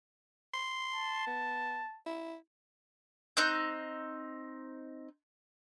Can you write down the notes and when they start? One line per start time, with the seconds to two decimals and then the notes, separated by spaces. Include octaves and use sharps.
0.54 C6
0.93 A5
1.27 B3
2.06 E4
3.37 C4 D#4 F#6 G6